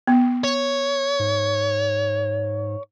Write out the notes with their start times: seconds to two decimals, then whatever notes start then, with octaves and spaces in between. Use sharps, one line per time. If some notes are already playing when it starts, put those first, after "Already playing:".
0.07 B3
0.44 C#5
1.19 G#2